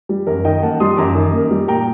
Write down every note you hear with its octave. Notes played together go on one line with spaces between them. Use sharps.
G3
F#2 A#4
D#3 D#5 G5
A#3 F#5 A5
G3 C6 D#6
F#2 A#5 D6
D#3
A#3
G3
A#2 G5 A#5